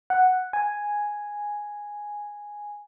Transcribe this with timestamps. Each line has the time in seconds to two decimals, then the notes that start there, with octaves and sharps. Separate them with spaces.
0.10 F#5
0.53 G#5